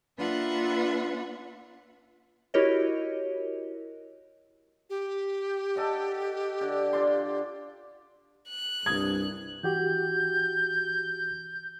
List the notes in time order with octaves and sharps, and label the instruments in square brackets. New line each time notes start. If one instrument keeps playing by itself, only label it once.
[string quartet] A#3 D4 F4 B4 E5 F#5
[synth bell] E4 F#4 G4 A#4 C#5 D#5
[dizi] G4
[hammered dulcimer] A4 D#5 F#5
D3
F4 D5 C6
[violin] F#6
[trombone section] C2 G2 [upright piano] D#6 G#6
[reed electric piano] E3 F#4 G4 [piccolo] G6